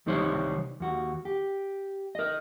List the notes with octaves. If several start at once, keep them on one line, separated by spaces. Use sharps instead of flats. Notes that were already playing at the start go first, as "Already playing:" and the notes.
C2 D#3 G3 D#4 C5 C#5
D#2 F#4
G4
A#4 D#5